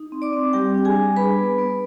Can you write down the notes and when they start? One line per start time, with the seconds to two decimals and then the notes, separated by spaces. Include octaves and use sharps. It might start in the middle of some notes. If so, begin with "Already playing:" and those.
Already playing: D#4
0.12 C4
0.22 D5 D6
0.33 C4
0.53 G3 G4 G5
0.75 D4
0.85 G#4 G#5
0.95 G3
1.16 D4 B4 B5
1.38 B3
1.58 B3